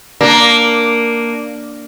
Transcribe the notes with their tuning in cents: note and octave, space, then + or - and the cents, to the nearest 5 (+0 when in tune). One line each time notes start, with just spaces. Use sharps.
A#3 +0 D4 +0